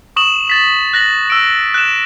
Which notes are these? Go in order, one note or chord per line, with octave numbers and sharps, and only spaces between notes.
C#6 D#6 E7 F#7
A6 B6 E7
F#6 A#6 F#7
E6 D7
F#6 E7